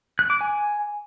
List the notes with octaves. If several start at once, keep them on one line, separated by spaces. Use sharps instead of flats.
F#6
D6
G#5